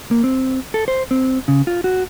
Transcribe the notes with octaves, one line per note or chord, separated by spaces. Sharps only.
A#3
C4
A4
C5
C4
C#3
F4
F#4